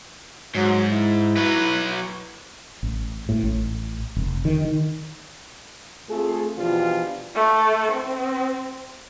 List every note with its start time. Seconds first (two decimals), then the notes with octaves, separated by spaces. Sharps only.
0.55 G#2 F#3
0.91 E4
1.37 F#3 B4
2.83 A1
3.29 A2
3.44 A1
4.16 F1
4.45 D#3
4.65 D#3
6.09 A3 C4 F4 G#4
6.56 B2 E3 F3 D4 F4 G4
7.35 A3
7.92 C4